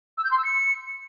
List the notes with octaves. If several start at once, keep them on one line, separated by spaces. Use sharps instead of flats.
E6
G6
C6
E6
C#7